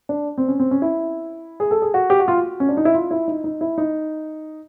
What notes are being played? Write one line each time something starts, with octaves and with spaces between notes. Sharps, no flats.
D4
C4
C#4
C4
C#4
E4
G#4
A4
G#4
F#4
G4
F#4
F4
F#4
C#4
D4
D#4
E4
F4
E4
D#4
D#4
E4
D#4